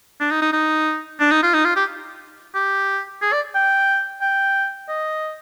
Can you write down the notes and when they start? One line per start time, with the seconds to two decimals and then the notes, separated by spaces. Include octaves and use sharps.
0.20 D4
0.31 D#4
0.42 D#4
0.53 D#4
1.20 D4
1.31 D#4
1.43 F4
1.54 D#4
1.65 F4
1.76 G4
2.55 G4
3.22 G#4
3.33 D5
3.55 G5
4.22 G5
4.89 D#5